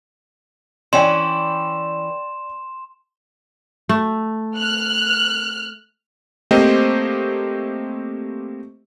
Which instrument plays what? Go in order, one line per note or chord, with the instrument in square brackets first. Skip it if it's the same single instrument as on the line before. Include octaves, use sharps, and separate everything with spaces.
[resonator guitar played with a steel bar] E3 C#4 [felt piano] D5 G5 [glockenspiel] C6 E7
[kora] A3
[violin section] F6 F#6
[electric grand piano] A3 A#3 C4 G4 C5 D#5